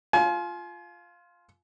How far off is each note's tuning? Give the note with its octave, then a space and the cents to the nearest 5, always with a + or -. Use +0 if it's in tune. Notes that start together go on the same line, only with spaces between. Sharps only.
F4 +0 G#5 +40